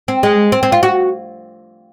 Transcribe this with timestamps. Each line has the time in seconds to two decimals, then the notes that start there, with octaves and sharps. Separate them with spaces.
0.08 C4
0.23 G#3
0.52 C4
0.63 C4
0.72 F4
0.83 F#4